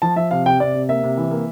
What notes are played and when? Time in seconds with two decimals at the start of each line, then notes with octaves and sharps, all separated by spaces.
0.02 F3 A5
0.16 F3 E5
0.31 C3 F5
0.46 C3 G5
0.60 C3 D5
0.74 C3
0.89 A#3 E5
1.04 C3
1.17 E3
1.31 A#3